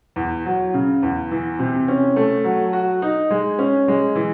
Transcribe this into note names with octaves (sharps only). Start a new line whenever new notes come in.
E2
F#3
C#3
E2
E3
C3
C#4
A3
F#3
F#4
D#4
G#3
C#4
G#3
E3